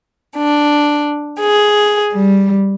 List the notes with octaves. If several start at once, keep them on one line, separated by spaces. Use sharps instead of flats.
D4
G#4
G3